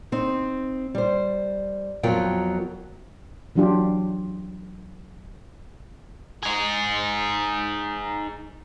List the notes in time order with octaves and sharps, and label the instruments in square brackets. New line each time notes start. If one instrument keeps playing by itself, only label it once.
[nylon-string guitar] C4 D#4
G3 C5
F2 F#3 B3 F4 A#4 G5
[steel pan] E3 F#3 D4 F4 G4
[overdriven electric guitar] D#4 G#4